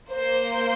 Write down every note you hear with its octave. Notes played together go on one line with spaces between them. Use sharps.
A#3 C5